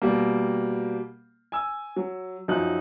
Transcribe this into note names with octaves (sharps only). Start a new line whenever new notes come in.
B2 G3 A#3
G#5 E6
F#3
F#2 F3 F#3 D#4 F#6